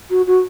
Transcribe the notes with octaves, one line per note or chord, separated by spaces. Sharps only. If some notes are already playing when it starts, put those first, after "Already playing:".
F#4
F#4